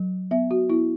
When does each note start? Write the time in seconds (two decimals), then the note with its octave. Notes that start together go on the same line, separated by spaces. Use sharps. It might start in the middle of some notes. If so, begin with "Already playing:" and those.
Already playing: F#3
0.31 B3 E5
0.51 F#4
0.70 B3 E4